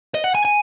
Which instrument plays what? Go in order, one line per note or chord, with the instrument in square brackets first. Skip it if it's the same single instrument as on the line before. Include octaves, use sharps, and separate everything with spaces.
[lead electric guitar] D#5
F#5
G#5
G#5